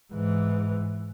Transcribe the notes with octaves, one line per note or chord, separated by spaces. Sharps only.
G#2 E3